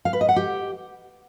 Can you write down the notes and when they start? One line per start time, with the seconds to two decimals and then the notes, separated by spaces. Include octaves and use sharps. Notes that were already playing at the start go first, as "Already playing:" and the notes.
0.05 F5
0.13 B4
0.21 D#5
0.29 F#5
0.36 G4